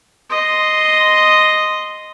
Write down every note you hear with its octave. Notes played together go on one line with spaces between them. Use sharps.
D#5 C6